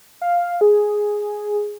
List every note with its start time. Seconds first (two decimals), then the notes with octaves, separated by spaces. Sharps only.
0.21 F5
0.61 G#4